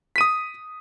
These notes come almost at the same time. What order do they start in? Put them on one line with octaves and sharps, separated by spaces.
B6 D#7 D#6